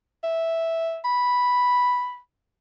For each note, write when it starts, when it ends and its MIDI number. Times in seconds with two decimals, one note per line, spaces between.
0.24 0.99 76
1.05 2.18 83